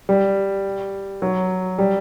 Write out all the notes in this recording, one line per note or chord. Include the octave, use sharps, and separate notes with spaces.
G3
F#3
G3